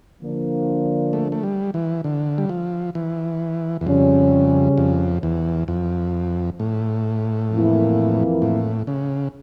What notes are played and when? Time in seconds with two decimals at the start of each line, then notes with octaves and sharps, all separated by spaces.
0.22 D3 F3 A#3 D4
1.13 A3
1.32 A3
1.43 G3
1.74 E3
2.04 D3
2.38 G3
2.49 F3
2.95 E3
3.81 E2
3.87 F2 C#3 G3 C#4
4.78 F2
5.23 E2
5.68 F2
6.60 A2
7.51 F2 E3 A#3 E4
8.42 A2
8.87 C#3